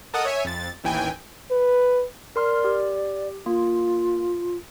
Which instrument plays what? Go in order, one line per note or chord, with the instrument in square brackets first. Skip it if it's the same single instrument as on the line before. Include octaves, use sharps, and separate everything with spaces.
[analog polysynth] A4 A#4 D#5 F#5 D#6
C#5 E5 G#5
F2 A6
A1 D#2 E3 G5 G#5
[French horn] B4
[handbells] A#4 C6 F6 [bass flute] D5
[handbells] G4
[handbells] A#3 [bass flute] F4